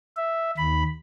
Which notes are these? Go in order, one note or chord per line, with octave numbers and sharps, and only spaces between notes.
E5
D#2 B5